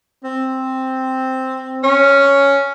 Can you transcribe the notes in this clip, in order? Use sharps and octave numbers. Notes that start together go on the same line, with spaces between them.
C4
C#4